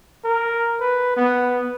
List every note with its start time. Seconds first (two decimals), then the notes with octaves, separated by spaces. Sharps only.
0.24 A#4
0.80 B4
1.17 B3